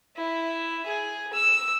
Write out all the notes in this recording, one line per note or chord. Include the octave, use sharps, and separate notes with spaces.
E4
G#4
E6